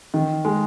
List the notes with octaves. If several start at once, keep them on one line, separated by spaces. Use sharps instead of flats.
D#3
G#3